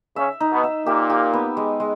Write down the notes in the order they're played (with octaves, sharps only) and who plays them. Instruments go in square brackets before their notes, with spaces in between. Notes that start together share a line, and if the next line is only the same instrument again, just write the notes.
[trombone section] C#3 C#4 [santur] E5
[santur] D#4
[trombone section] B2 B3
[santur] E5
[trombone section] A#2 A#3 [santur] G4
[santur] G4
B3
G#3
G#3